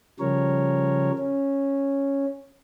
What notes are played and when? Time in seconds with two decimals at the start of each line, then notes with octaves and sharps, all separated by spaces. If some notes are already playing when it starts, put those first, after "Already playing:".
0.20 C#3 F3 G3 A#4 C#5
1.18 C#4